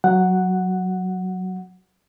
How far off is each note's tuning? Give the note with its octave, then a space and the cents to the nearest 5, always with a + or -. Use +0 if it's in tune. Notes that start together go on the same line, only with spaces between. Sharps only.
F#3 +0 F#5 +0